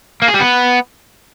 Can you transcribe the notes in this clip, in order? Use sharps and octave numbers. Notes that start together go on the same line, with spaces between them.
A#3
G#4
G3
B3